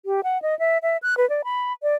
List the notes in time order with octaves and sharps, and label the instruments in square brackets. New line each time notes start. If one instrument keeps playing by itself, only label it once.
[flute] G4
F#5
D#5
E5
E5
F#6
B4
D5
B5
D5